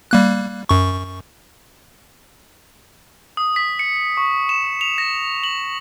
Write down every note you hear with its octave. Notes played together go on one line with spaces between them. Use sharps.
G3 A#3 F#6
F#2 C#6
D#6
B6
C#7
C#6
E7
F7
A#6
F#7